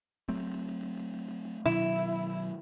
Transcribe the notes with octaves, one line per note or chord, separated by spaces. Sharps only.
F#3 A3 C4
B2 D#3 F#3 E4